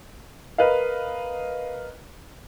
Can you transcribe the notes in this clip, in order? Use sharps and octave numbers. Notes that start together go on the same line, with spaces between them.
A#4 B4 D#5 F5